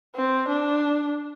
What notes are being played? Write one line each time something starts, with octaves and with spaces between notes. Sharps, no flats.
C4
D4